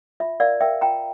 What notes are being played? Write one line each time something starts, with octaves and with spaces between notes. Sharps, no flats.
F4 E5
A#4 D5 F5
A#4 E5 G5
F4 G5 A#5